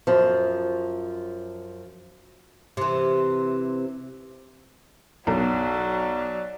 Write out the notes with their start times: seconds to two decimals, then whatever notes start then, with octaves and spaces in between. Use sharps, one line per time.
0.07 F#2 F3
2.77 C3 E3
5.27 B1 F#3 D5